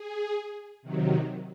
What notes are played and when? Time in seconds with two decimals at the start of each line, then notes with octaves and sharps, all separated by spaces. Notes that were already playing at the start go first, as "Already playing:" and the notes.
Already playing: G#4
0.82 C3 D#3 F#3